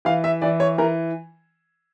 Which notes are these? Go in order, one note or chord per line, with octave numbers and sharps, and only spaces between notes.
E3 F5
E5
E3 D5
C#5
E3 A#4